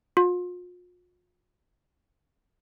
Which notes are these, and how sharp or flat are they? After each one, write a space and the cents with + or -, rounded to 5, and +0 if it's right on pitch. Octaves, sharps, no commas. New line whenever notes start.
F4 +40